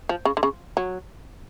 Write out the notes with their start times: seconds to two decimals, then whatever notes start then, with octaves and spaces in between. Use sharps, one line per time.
0.09 F3
0.25 C#3
0.37 D3
0.43 C#3
0.77 F#3